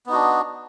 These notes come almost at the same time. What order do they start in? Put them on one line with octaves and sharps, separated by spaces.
B3 D#4 F#4 D4